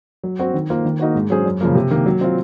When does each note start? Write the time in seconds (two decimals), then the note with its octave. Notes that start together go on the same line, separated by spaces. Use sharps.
0.24 F#3
0.39 C4 F#4 C5
0.54 D#3
0.70 A#3 F4 C5
0.85 D#3
0.99 A#3 D#4 F#4 C5
1.15 G#2
1.30 F#3 C#4 G#4 C5
1.45 F#2
1.61 C#3 F3 A#3
1.75 C3
1.91 D#3 A#3
2.06 F#3
2.21 C4 F4